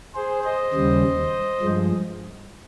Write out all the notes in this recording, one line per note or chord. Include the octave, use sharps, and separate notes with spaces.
G#4 C5
C5 D#5
D#2 C#3 G3
G2 F3 G#3